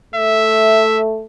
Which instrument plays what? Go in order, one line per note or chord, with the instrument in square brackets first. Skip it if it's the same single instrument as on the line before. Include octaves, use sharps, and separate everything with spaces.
[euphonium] A3 [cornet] E5